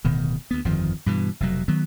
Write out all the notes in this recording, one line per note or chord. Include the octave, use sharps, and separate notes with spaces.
D1 B2 D#3
D2 B3
G1 F2 D#3 F3
G2 B2 E3
F1 B2 F#3
D#3 F#3 B3